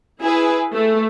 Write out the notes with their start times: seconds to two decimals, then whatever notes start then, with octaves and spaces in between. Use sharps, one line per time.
0.21 E4 G#4 B4
0.73 A3